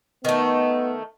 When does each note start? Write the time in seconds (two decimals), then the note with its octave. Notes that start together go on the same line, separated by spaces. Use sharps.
0.25 D#3 A3 B3